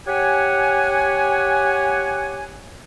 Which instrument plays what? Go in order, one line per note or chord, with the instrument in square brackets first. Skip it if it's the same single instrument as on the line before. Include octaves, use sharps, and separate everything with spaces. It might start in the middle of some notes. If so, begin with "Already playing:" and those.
[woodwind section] G4 C#5 F#5 G#5